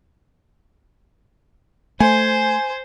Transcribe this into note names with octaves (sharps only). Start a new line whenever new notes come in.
A3 C5 G#5